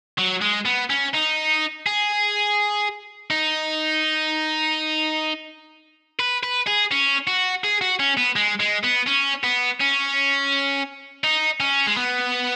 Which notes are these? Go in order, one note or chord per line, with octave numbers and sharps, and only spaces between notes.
F#3
G#3
B3
C#4
D#4
G#4
D#4
B4
B4
G#4
C#4
F#4
G#4
F#4
C#4
B3
G#3
G#3
B3
C#4
B3
C#4
D#4
C#4
G#3
B3